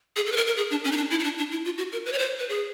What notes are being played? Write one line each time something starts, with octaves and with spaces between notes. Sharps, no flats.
G#4
A4
B4
A#4
A#4
G#4
D4
C#4
D#4
D4
E4
D#4
D4
D4
E4
F4
F#4
A#4
B4
C#5
C5
B4
G#4